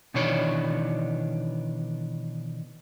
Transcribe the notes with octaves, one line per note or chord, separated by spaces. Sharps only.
B2 D#3 E3 D4 C#5